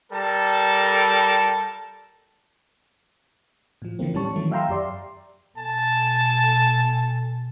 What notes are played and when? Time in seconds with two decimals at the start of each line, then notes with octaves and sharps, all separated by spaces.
0.12 G3 A4 A#4 A5
3.82 A2 F3
3.99 D3 E3 F3 A3 A#3 C4
4.14 A2 G3 C#4 A5 C#6
4.36 D#3 E3 F#3 A3
4.51 E5 F5 G5 A#5 C6 E6
4.69 F#2 G4 D5 C6
5.57 B2 A4 G#5 A5